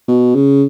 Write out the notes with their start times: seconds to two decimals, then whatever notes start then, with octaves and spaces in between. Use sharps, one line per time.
0.08 B2
0.35 C#3